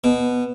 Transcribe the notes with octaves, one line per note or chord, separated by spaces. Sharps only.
B2